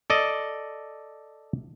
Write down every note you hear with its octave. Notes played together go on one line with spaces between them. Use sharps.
A4 D5 D#5